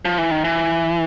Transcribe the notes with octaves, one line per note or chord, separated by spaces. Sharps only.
F3
E3
D#3
E3